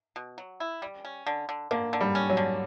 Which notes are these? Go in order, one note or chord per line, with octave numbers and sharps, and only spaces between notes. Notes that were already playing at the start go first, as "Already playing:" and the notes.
B2
F#3
E4
G3
C#4
D3
D3
D3 A#3
D3
G3
C#4
F#3
D3